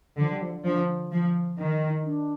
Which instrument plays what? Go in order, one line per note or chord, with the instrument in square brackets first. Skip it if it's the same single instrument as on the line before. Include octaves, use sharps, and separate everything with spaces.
[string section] D3 [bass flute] F3
[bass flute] G3
F3
[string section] F3 [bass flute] D4
[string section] F3
[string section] D#3 [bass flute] D#4
[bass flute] D#4
D4